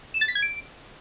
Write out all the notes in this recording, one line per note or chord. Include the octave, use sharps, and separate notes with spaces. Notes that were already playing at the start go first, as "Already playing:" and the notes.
E7
A6
B6
G#6
D7